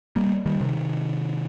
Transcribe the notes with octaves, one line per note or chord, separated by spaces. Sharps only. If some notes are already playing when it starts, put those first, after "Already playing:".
G3 A#3
D#3 G3
C3 D#3